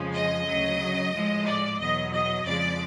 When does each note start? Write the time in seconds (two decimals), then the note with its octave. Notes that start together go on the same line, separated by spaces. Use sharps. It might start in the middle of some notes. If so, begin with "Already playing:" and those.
Already playing: F2 C#3 F3 G#3
0.15 D#5
0.47 D2 C#3 F#3
1.14 A2 F3 G#3
1.46 D5
1.79 E2 B2 F#3 D#5
2.13 D#5
2.46 F2 C#3 F3 G#3 D5